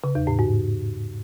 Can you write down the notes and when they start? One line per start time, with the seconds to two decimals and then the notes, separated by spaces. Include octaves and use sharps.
0.04 C#3
0.15 E2
0.27 A2
0.39 G#2